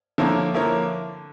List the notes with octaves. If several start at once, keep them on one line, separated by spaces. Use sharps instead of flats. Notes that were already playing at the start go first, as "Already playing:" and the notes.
D3 F3 A#3 E4 A#4 C#5
F3 A#3 E4 A#4 C#5